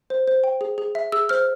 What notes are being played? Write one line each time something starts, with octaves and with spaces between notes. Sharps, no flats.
C5
C5
G5
G#4
G#4
E5
G#4 E6
C5 F6